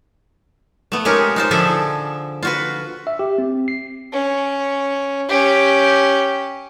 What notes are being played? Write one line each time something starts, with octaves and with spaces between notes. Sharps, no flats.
A3 B3
G#3 C#4 D#4 G4 A#4 C#5
D#4 F4 C5
D3 F3 G#4 A4 D5 E5
F4 F#4 B4
E5
G4
C4
C7
C#4
C#4 G4